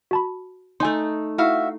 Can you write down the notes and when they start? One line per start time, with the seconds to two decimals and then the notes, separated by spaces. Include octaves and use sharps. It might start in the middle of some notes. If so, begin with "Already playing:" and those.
0.11 F#4 A5 B5
0.80 A3 D#4 G#5 C6
1.38 E4 F#4 E5 F5